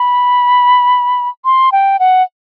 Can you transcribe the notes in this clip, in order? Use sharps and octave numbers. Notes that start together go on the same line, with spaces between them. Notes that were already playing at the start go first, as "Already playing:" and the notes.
Already playing: B5
C6
G5
F#5